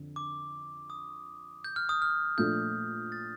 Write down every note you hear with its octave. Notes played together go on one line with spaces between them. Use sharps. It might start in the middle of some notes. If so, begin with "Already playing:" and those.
Already playing: F2 D3
D6
D#6
G6
F6
D#6
F6
A#2 F3 A3 D4 A4 G6
A6